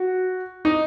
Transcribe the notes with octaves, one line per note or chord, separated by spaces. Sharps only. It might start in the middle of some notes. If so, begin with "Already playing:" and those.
Already playing: F#4
D#4